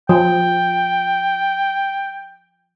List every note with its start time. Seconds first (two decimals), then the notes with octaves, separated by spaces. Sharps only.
0.09 F3 G5